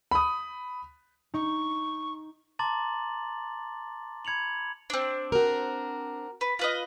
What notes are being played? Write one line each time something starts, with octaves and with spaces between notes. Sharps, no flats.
B5 D#6
D#4 C#6
A5 A#5 C6 D6 A6 F#7
B5 G#6 C#7 F7 F#7
C4 D4
F#4 A#4
B4
F4 B4 D#5